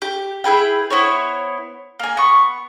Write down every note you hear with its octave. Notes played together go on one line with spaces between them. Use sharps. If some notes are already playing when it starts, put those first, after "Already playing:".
G4
E4 G#4 B4 G5
B3 E4 C5 C#5
A#3 G#5
B3 C#6